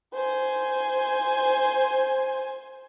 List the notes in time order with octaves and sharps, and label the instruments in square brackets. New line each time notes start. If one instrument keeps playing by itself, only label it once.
[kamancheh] C5 G#5